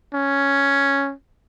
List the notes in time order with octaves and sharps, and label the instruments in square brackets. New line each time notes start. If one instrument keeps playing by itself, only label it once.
[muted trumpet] C#4